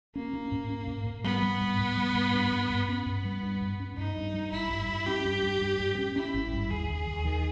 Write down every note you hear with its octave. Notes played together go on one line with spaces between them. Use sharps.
A#3 C#4
C#4
G#2
C#4
G#2
G#2
G3 B3
G3
G#2
G#2
G3
G#2
G2
G2
G2
B3 C#4
G2
G3
G2
G2
C#4
G2 D#4
G2
G3
G#1 E4
G2
G2
C#4 G4
G2
G2
G2
G2
C#4
C#4 E4
G#1
G2
D#2 G#4
D#2
D#2
D#3